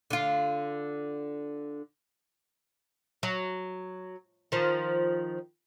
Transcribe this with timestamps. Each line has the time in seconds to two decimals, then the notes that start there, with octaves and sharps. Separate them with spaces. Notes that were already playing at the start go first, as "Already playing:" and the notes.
0.10 D3 F4
3.23 F#3
4.52 D#3 F3